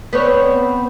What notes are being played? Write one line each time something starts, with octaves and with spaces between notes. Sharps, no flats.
B3 C4 C#5